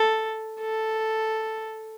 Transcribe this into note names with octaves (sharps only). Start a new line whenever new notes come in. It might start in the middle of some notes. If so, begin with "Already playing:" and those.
Already playing: A4
A4